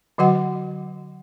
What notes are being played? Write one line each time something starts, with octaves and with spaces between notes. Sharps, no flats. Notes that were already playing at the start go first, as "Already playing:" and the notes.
D3 F#3 F#4 D#5 F#5